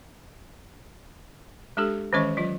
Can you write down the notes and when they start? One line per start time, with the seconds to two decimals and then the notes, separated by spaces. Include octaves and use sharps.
1.77 G#3 D4 G4 A4
2.13 D#3 E3 G#3 C#4 D#5 C#6
2.37 F#3 F4 D#5